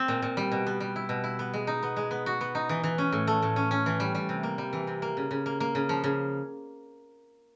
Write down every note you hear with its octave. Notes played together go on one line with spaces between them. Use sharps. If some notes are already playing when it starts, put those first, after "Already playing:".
Already playing: C4
A#2
A#2
G3
B2
B3
G3
E4
B2
E4
B3
G#3
D#4
B3
G#3
B3
F#4
B3
D#4
E3
E3
C#4
A2
A3
A2
C#4
C#4
E3
G3
G3
C3
A#3
G3
E3
C3
A#3
C#3
C#3
A#3
A#3
C#3
F3
C#3